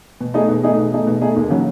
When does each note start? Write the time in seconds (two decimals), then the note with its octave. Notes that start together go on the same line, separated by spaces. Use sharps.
0.20 B2
0.34 A3 D#4 G#4
0.49 B2
0.63 A3 D#4 G#4
0.78 B2
0.92 A3 D#4 G#4
1.07 B2
1.22 A3 D#4 G#4
1.36 D#2
1.50 C#3 F#3